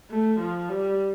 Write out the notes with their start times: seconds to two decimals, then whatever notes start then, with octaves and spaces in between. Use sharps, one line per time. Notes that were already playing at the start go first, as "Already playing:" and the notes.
0.10 A3
0.39 F3
0.69 G3